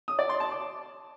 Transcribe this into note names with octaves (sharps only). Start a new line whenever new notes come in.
D#6
D5
C6
A5
D6